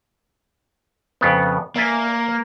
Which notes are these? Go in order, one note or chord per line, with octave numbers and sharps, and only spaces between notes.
F2 C#3 B3
A#3 D5 E5 G#5